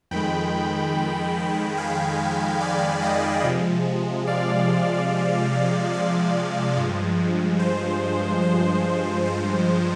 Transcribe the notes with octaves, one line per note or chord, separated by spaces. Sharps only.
F2 D#3 G#3 G5 B5
F5 G#5
D5 F5
D#5 G5
C3 F3 G#3
D5 F5
D5 F5
G2 F3 G#3
C5
C5
C5